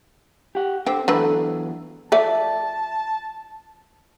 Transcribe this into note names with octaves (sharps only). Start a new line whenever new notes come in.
G4 F#5
D3 C4 G5
E2 D3 F#3 A3 B4
F3 A3 D5 E5 A5